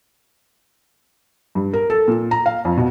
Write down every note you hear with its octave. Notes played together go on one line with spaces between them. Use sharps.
G2
A#4
A4
A#2
A#5
F5
F2
B2